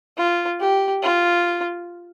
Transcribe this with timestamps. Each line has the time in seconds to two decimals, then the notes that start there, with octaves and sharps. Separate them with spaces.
0.17 F4
0.60 G4
1.03 F4